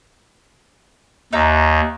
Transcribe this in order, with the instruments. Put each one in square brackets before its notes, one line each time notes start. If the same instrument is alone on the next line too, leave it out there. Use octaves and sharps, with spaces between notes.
[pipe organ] D#2 [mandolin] D#4 E5 A#5